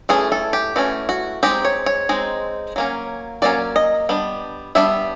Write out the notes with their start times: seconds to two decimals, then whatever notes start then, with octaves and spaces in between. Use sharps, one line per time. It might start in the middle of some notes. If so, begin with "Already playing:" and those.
0.09 E3 A3 C#4 G#4
0.32 A4
0.53 G4
0.76 E3 A3 C#4 F#4
1.09 F#4
1.43 G#3 C4 D#4 G4
1.65 C#5
1.86 C#5
2.09 G#3 C4 D#4
2.76 F#3 A#3 C#4
3.42 F#3 A#3 C#4 D5
3.76 D#5
4.09 G3 B3 D4
4.75 G3 B3 D4 E5